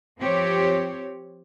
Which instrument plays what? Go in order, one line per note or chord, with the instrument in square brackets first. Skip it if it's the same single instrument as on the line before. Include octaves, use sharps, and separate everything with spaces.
[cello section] F3 C4 G4 C#5